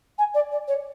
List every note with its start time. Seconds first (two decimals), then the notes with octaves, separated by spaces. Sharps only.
0.18 G#5
0.34 D5
0.52 D5
0.68 C#5